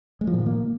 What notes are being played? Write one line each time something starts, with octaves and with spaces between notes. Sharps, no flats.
G#3
F3
A#2
D#3
A#3